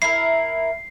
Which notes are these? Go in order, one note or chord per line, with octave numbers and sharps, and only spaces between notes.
E4 A#4 C7